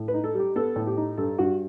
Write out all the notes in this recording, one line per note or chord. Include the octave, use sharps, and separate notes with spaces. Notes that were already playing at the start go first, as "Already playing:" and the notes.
Already playing: A2
B4
D#4
A4
G3 G4
B3 A4
A2
G4
D#4
G2 A4
G2 F#4